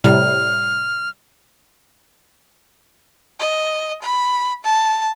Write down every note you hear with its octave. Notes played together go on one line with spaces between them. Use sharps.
A2 C3 G3 F6
D#5
B5
A5